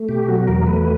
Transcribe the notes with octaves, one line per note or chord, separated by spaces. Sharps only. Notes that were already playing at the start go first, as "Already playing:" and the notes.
Already playing: A3
B2 G4
F#3 F#4
E2 A#4
A3 B4